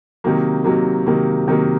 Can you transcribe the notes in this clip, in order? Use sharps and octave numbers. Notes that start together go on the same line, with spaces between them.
C3 D#3 F#3 A#3
C3 D#3 F#3 A#3
C3 D#3 F#3 A#3
C3 D#3 F#3 A#3